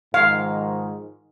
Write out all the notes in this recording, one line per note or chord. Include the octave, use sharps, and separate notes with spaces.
G#2 D#3 F3 F5